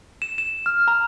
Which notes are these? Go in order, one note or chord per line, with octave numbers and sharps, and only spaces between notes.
E7
E7
F6
A#5